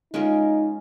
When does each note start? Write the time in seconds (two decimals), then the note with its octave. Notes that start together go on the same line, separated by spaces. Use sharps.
0.14 G#3 C#4 D#4 F4 A#4